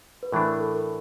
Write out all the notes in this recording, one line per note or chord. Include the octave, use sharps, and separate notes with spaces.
B4
A2 E3 A3 D4 A#4
A#4
A4
A#4